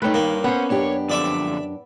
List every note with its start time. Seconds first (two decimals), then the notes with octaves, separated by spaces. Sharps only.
0.02 G2 A3 D#4 B4 C#5 G5
0.14 D#3 A#3
0.44 B3 C#4 C5 F#5
0.70 F#2 D4 G4 C#5
1.10 F2 D3 D5 E5 D6